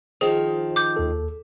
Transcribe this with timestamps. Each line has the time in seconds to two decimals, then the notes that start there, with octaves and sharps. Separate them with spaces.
0.21 D#3 F3 G#4 C5
0.76 D6 G6
0.96 D#2 A4